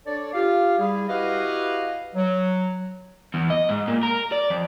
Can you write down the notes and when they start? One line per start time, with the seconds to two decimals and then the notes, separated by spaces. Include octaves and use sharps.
0.06 D4 A4 C#5 D5
0.33 F4 G4 F5
0.78 G3 E4 G#4
1.08 E4 F#4 G4 B4 D#5 F5
2.15 F#3
3.34 E2
3.50 D#5
3.69 G#2
3.88 A#2
4.03 A#4
4.32 D5
4.50 F2